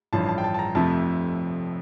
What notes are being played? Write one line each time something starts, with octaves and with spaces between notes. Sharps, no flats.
A1 G2 F3 A5
A5
G5
A5
A5
A#5
F1 F2 C3 F3 A3 A5